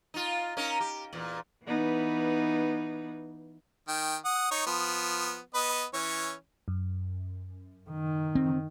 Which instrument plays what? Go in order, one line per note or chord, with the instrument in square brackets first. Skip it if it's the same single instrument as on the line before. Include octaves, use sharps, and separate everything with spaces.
[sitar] D#4 F4
C#4 D#4 A#4
G4
E2 A#2
[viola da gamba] E3 B3 D#4
[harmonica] D#3 G5
F#5 D#6
D#4 C#5
F3 B3
B3 B4 D#5
E3 C#4 C#5
[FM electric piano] F#2
[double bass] D#3
[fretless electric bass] C4